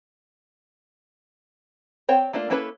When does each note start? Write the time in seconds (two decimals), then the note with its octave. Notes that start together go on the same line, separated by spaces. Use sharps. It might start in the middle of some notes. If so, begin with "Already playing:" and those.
2.09 C4 C#5 G5
2.33 A3 A#3 D4 F4
2.50 A#3 C#4 E4 A4 B4